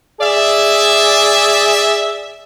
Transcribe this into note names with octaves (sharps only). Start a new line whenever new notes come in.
G#4 D5 E5